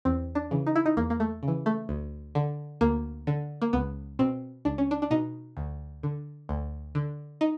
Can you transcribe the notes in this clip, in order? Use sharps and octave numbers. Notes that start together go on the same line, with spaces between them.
E2 C4
D4
C#3 E3
D#4
E4
D#4
E2 A#3
A#3
A3
C#3
E3
A3
D2
D3
D2 A#3
D3
A#3
C#2 B3
B2 C4
C#2 D4
C#4
D4
D4
B2 D#4
D2
D3
D2
D3
D#4